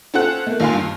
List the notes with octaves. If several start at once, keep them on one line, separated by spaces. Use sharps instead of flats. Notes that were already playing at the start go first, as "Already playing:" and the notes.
C#4 F4 A4 C5 F#5 F#6
A3 A#3
A1 D#2 F4 F5 G#5 C6
G2